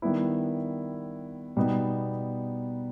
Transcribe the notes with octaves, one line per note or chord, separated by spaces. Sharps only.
D#3 G3 B3 E4
B2 G3 B3 D#4